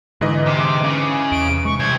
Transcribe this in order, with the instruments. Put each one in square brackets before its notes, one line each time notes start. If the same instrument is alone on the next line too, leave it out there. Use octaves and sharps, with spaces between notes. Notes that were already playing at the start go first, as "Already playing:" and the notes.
[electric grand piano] G#2 E3 D#5 [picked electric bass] D3
[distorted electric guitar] C3 [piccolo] D6
[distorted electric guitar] C#3
[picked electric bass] E2 [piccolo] D7
[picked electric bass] C3 G#3 [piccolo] C#6
[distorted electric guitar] C2 C5 [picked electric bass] E3 [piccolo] G#6